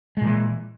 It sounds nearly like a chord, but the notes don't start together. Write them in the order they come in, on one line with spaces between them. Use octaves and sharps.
G#3 A#2 E3